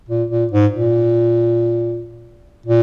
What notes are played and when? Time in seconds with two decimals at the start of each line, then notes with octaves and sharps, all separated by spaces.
0.09 A#2
0.30 A#2
0.52 G#2
0.73 A#2
2.66 A#2